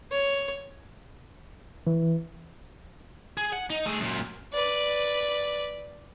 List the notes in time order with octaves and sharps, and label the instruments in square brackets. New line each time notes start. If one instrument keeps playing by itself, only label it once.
[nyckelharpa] C#5
[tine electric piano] E3
[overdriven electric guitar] G#4
F#5
D#4
A3 G#4
F#2 A#2
[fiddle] B4 D5